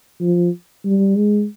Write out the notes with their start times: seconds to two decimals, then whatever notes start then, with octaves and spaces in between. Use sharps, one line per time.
0.20 F3
0.85 G3
1.16 G#3